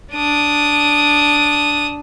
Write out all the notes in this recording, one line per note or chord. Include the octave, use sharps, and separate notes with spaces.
D4 D#6